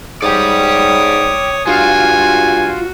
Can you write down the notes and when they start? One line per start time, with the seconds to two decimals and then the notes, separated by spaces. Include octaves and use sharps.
0.22 G#2 C#5 D5 G5 D#6
1.67 G2 F4 F#4 G#5